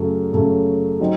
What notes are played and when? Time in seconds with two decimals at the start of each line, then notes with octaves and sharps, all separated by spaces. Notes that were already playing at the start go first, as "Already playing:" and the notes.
Already playing: F#2 C#3 A3 C#4
0.33 F#2 C#3 A3 C#4
1.00 F#3 C4 D#4